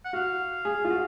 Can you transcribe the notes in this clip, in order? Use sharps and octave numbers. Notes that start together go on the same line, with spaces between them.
F#5
F#4 F5
G#4
F4
F#4